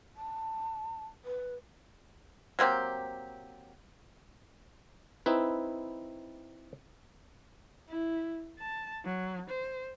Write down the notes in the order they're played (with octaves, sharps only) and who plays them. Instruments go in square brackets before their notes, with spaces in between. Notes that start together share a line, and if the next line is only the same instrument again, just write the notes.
[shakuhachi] A5
B4
[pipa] F#3 A#3 C4 G4
[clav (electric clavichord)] C4 D#4 E4 B4
[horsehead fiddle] E4
A5
F#3
C5